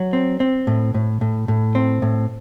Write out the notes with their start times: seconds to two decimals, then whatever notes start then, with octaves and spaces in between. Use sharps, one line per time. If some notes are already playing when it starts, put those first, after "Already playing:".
Already playing: F#3
0.13 C4
0.40 C4
0.67 A2
0.94 A2
1.21 A2
1.48 A2
1.75 C4
2.02 A2